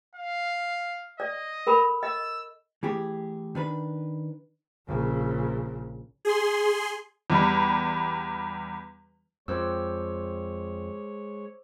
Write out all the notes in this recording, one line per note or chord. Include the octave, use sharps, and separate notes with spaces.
F5
D5 D#5
A4 A#4 B5
D#5 E6
E3 A3 G4 G#4
D#3 D4 B4
A#1 C#3
G#4 C6
E2 G3
F2 G#3 C5 C#5 D6 E6